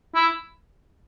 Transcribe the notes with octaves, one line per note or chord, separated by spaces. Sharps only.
E4